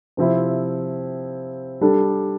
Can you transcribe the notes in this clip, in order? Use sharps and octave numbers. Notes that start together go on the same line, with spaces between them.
C3 F3 C4 E4
G3 D4 A4